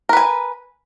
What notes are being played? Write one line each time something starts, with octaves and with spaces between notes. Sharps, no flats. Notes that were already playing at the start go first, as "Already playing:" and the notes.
A#4 B4 G#5